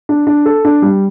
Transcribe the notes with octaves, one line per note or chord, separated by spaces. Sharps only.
D4
D4
A4
D4
G3